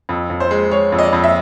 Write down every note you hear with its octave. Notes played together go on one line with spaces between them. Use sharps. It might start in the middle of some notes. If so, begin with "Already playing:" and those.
F2
F2
C5
G#3
G#3 C#5
F2
D#5
D5
F2
E5